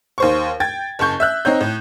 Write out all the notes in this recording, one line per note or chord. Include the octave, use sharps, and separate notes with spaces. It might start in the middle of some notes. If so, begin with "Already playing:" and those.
D#2 C5 C#6
G5 G#6 A6
F#1 A5 C#6 G6
E5 E6 F#6
C4 D#4 C#5 G6
A2